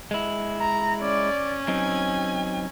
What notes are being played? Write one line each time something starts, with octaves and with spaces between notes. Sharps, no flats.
G#3 E4
A#5
C#4 D5
F#3 C4 D#4 G#5